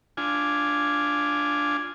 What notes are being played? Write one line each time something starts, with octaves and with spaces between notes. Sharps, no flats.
D4 F4 G#5